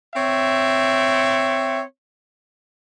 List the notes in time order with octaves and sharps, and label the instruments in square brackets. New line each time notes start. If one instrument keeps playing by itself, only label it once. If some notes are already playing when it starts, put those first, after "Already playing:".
[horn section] C4 C#5 E5